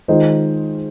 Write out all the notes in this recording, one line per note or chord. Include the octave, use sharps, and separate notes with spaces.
D#3 G#3 F4 C5 D#5